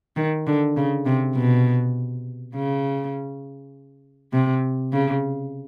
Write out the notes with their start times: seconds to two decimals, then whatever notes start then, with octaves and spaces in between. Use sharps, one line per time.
0.16 D#3
0.47 D3
0.77 C#3
1.06 C3
1.35 B2
2.55 C#3
4.33 C3
4.93 C#3